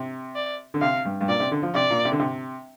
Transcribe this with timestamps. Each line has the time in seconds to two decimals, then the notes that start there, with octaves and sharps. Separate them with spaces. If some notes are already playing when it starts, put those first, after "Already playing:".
Already playing: C3
0.35 D5
0.74 D3
0.81 C3 F5
1.05 G2
1.21 G2
1.28 A#2 D5
1.40 C3
1.52 D3
1.62 F3
1.75 C3 D5
1.90 A#2
2.05 C3
2.12 D3
2.20 C3